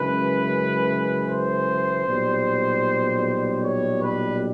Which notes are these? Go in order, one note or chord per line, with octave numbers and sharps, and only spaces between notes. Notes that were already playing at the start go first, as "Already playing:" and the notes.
Already playing: F#2 C#3 E3 G#3 B4
C5
B1 A#2 G3
C#5
B4